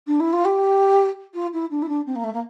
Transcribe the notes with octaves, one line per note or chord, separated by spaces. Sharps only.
D4
E4
F4
G4
F4
E4
D4
E4
D4
C4
A#3
A3
A#3